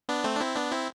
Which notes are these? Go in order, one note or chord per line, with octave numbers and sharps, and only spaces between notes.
B3 D4
A3 C4
D4
C4 E4
B3 D4
C4 E4